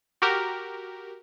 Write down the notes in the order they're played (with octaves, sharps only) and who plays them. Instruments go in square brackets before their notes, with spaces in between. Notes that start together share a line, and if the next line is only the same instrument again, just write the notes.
[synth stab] F#4 G4 A#4